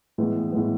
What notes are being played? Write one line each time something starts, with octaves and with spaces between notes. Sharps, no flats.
A2 E3 G#3 B3
A2 E3 G#3 B3